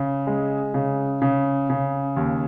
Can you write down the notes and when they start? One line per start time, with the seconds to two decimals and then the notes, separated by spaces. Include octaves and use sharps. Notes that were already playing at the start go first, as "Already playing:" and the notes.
Already playing: C#3
0.27 G#3
0.74 C#3
1.22 C#3
1.70 C#3
2.16 D#2